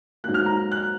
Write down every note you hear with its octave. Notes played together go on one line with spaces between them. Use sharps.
G#2 F#3 A#3 F#6
F6
A#5
F#6